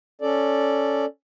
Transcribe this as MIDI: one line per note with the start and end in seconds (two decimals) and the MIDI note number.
0.21 1.05 61
0.21 1.05 69
0.21 1.05 74